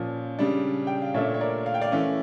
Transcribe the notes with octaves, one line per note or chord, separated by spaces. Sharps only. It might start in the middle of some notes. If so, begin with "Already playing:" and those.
Already playing: A#2 F3 C#4
C#3 G3 D4
G5
F5
A#2 A3 D4 C#5 E5
C#5
A#4 D5
F5
G5
D5 F5
E3 A3 C#4